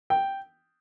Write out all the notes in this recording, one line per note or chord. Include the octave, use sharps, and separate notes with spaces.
G5